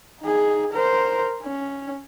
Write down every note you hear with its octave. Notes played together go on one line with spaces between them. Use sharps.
D#4 G#4
A#4 C5
C#4